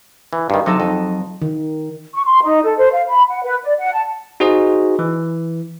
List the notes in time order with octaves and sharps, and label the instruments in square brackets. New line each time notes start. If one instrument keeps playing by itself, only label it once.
[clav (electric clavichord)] E3
G2 D#3
[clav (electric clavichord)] C3 [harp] F#3 D#4 A4
[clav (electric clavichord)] F2 [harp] D#4
[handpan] D#3
[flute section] C#6
C6
D#4
A4
C5
F5
B5
F#5
B4
D5
F#5
A5
[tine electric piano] D#4 F#4 G#4 C5 D#5
E3